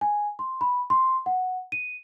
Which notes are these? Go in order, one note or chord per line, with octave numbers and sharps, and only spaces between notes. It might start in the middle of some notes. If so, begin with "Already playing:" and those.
G#5
C6
B5
C6
F#5
D#7